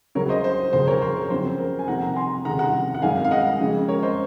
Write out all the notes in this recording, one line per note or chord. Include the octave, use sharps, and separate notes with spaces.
C#2 C#3 F#3 A#4 C#5
C5 D#5
C5
F#1 F2 C#3 C5
A#4 C#5
C5
A#4
F2 C#3 F#3 C#4 C5
A#4
G#5
F1 F2 C3 D#3 A#3 F#5 A#5
F#5 A#5
G#5 C6
F1 D#2 C#3 F#5 A#5
F#5 A#5
F#5
G#1 F#2 D#3 G#3 F5 G#5
F5
D#5 F#5
F2 C#3 G#3 C#4
A#4 C#5
C5 D#5